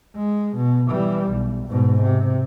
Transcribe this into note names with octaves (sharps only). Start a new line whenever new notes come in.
G#3
B2
E3 G3
B1
G#2 B2
C3